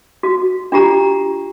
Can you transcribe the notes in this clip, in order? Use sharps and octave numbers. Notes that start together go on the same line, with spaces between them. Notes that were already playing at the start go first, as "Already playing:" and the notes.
F#4
D4 F4 G4 A#5